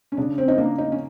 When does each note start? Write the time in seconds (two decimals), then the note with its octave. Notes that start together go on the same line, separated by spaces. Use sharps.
0.12 C#4
0.17 C#3 D4
0.38 C4
0.48 D#4
0.58 A#3 D4
0.78 D#4
0.92 C#4